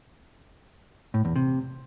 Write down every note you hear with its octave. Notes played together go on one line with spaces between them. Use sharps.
A2
E2
C3